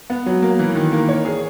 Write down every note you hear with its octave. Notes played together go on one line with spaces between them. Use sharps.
B3
F#3
A#3
E3
D#3
A#3
C#5
G#4